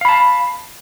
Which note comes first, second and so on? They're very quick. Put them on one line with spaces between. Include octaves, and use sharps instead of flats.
F5 B5 A5